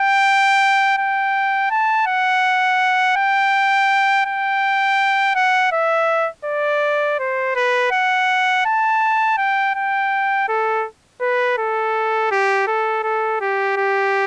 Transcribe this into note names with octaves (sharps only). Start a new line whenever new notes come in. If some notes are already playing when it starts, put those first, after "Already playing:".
Already playing: G5
G5
A5
F#5
G5
G5
F#5
E5
D5
C5
B4
F#5
A5
G5
G5
A4
B4
A4
G4
A4
A4
G4
G4